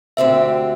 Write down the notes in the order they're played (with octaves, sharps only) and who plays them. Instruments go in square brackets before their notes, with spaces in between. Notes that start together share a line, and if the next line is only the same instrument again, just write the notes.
[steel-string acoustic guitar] D2 D3 C4 G4 [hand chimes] E5